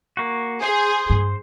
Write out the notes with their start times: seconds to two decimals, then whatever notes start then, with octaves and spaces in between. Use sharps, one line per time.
0.17 A#3 F#4
0.62 G#4 C5
1.10 G2